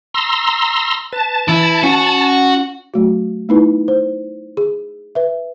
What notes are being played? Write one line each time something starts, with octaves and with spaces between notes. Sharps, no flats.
A#5 C6 E6
B4 A5
E3 E4
C#4 F#4
F#3 A3 F#4
A3 B3 D#4 E4 B4
C5
G#4
B4 E5